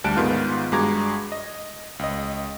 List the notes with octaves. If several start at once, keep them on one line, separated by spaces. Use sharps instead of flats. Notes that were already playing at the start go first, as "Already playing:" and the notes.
D2 G3 A5 F#6 D7
G#2 D#3 B3 F4 F6
G2 G#3 F#4 A#5 D6 G#6
D#5
C#2 D#5